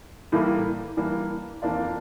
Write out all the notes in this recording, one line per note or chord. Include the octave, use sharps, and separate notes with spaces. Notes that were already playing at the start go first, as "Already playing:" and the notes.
A2 E3 G3 A#3
E3 G3 A#3 D4
F2 E3 A#3 D4 F4